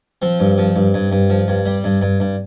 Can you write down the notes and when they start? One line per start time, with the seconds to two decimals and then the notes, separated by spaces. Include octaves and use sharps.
0.22 F3 C4
0.40 G2
0.58 F3
0.76 G2
0.94 G2
1.12 G2
1.30 F3
1.48 G2
1.66 G3
1.84 G2
2.01 G2
2.20 G2